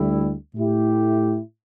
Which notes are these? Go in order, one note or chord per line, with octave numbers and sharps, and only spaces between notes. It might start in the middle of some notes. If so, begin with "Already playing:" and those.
Already playing: D2 D3 G3 E4
A2 A3 E4 G4